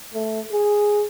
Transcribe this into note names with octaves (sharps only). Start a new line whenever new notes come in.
A3
G#4